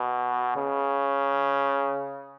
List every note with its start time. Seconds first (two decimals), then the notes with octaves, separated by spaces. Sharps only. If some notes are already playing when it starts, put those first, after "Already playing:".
Already playing: B2
0.56 C#3